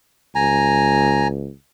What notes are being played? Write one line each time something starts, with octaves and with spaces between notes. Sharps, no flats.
C#2 G#5 A#5